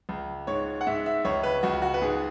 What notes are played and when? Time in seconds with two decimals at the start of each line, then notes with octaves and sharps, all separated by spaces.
0.09 C#2
0.47 G#2 C#5
0.81 F#5
0.87 G#2 E5
1.06 E5
1.25 C#2 C#5
1.43 B4
1.63 C#2 F#4
1.82 F#4
1.94 B4
2.02 G#2 G#4